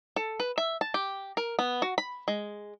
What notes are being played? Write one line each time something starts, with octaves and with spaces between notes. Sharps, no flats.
A4
B4
E5
A5
G4
A#4
B3
F#4
B5
G#3